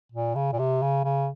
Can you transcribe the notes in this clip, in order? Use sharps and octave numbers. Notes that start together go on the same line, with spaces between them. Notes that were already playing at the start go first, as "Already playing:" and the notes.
A#2
C#3
A#2
C3
C#3
C#3